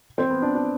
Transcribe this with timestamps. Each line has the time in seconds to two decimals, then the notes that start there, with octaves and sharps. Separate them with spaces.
0.18 C4
0.30 B3
0.42 D4
0.55 D4